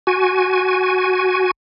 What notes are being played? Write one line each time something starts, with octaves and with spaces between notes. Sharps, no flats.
F#4 G#5